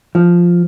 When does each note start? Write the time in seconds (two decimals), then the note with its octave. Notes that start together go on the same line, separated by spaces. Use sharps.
0.15 F3